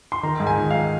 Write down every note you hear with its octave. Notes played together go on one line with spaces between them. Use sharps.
C6
D#3 A#5
G#2
G#5
D#3
D#3 F5